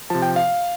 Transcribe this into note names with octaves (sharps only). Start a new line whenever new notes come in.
C3 F3 A5
G5
F5